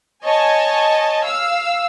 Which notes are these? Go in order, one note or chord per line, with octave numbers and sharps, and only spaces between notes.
C#5 D#5 G#5 A5
F5 E6